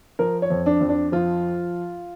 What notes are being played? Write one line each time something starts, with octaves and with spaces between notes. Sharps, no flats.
F3 A#4
C#5
F2
D4
F2
D4
F3 F4